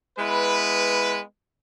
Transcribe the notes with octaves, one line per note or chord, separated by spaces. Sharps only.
G#3 B3 E4 B4